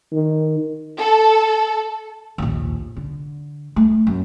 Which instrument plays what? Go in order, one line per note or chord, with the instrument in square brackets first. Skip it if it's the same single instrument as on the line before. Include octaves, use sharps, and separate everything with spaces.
[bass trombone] D#3
[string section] A4
[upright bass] A#1 D#2
D3
A3
F#2